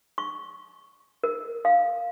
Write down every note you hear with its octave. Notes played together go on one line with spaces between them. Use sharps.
C#6
A#4
F5